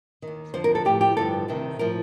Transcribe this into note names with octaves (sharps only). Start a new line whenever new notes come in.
D#3
D#2
F2 D3 F3 C5
A#4
A4
A2 F3 G4
G4
G2 D3 F3 A4
D2 C3 D#3
A2 F3 A#4